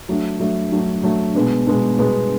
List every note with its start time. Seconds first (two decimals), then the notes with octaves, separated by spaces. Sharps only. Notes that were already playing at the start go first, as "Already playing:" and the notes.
0.09 F#3 A3 D4
0.40 F#3 A3 D4
0.72 F#3 A3 D4
1.03 F#3 A3 D4
1.35 B2 G#3 B3 D4
1.66 B2 G#3 B3 D4
1.97 B2 G#3 B3 D4